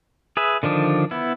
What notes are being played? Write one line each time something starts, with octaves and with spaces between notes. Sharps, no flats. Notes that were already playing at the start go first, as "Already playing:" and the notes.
G#4 B4 E5
D3 D#3 F3 D4
B3 E4